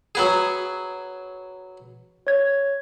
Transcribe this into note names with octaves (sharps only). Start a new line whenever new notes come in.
F#3 B3 G#4
C#5 G#6